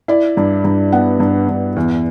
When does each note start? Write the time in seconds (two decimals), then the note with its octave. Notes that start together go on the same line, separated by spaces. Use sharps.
0.08 E4 D5
0.37 G2
0.64 G2
0.92 B3 F#5
1.20 G2
1.49 G2
1.76 E2